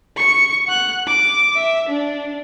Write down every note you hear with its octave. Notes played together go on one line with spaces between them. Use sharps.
C#6 C#7
F#5 F#6
D6
E5
D4